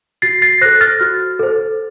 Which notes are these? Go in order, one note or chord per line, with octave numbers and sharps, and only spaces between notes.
F#4 A6 C7
A6 C7
A4 C5 F#6 A#6
F6 A6
F#4
A4 C5